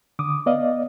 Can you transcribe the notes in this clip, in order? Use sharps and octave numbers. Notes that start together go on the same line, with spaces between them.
D3 D6 D#6
B3 D5 D#5 F5